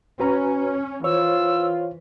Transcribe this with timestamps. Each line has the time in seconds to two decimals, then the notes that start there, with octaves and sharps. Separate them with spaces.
0.20 C#4 F#4 B4 A#5
1.04 E3 F4 C5 C#5 E6